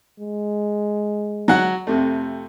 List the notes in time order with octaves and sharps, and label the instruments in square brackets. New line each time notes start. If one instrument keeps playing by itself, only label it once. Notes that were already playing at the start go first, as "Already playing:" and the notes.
[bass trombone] G#3
[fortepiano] F#3 F#5
F2 C3 A3